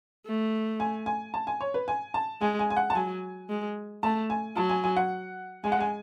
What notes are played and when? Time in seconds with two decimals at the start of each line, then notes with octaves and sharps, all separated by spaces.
0.26 A3
0.80 G#5
1.06 G#5
1.34 A5
1.47 G#5
1.61 C#5
1.74 B4
1.88 G#5
2.14 A5
2.41 G#3 G#5
2.59 G#5
2.70 G#5
2.76 F#5
2.90 A5
2.95 F#3 G#5
3.49 G#3
4.03 A3 A5
4.30 G#5
4.56 F#3 A5
4.69 G#5
4.84 G#5
4.96 F#5
5.64 G#3 G#5
5.72 F#5
5.81 G#5